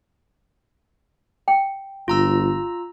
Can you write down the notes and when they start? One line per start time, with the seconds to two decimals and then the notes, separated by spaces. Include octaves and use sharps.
1.48 G5
2.08 G1 F4 A#5 E6